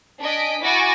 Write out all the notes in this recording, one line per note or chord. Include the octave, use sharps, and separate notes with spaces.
D4 D#5 G#5 B6 D7
E4 F#4 G#5 D6 A6 A#6